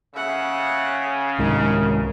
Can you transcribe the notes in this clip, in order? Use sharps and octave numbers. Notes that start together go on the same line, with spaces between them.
C#3 E5 F#5
C2 G#2 D#3 A#4